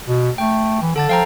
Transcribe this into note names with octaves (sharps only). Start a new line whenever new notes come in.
B2
A3 G5
E3
D3 A4 A5 A6
F3 F5 G5 A#5